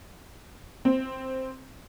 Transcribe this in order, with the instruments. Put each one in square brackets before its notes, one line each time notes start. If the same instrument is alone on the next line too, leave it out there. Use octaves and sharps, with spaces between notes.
[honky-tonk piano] C4